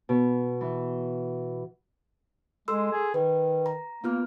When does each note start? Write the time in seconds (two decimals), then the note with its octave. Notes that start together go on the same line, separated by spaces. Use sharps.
0.09 B2
0.61 E3
2.68 G#3 A4 C6 E6
2.92 G#4
3.14 D#3 B4
3.66 A#5
4.04 A#3 B3 F4 F6